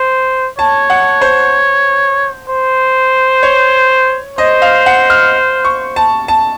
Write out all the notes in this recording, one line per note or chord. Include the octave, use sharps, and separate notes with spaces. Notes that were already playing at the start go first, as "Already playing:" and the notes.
Already playing: C5
C#5 A5
F#5
C5
C5
C#5
C5 D#5
F5
F#5
F6
C#6
A5
A5